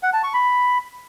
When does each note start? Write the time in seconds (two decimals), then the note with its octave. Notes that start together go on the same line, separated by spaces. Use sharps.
0.03 F#5
0.13 A5
0.23 C#6
0.34 B5